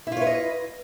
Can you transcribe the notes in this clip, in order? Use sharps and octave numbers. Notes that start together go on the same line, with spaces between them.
E4 F4 B4 C#5 D#5